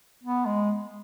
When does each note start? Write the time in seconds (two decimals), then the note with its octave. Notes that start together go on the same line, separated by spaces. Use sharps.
0.24 B3
0.46 G#3